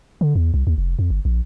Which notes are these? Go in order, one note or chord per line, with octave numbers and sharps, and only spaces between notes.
D3
E2
C2
D#2
F1
F2
G1
A#1